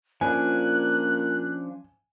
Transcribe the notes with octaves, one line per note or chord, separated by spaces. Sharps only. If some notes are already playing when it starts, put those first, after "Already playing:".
A#2 F3 C#4 D4 G#5 F#6